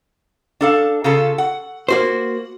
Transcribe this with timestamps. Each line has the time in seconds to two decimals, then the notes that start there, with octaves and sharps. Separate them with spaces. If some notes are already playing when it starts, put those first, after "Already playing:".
0.61 D4 A4 F5
1.04 C#3 F4 A4
1.38 F#5
1.89 A#3 F#4 C5